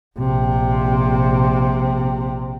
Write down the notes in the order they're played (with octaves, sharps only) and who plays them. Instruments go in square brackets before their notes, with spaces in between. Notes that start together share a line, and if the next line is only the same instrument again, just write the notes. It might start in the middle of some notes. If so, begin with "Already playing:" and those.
[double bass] A#1 C3